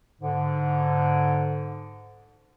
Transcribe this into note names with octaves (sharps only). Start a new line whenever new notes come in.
G#2 D3